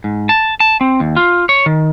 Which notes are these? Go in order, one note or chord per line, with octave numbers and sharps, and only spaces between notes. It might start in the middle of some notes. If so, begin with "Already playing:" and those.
G#2
A5
A5
C4
D#2
F4
C#5
D#3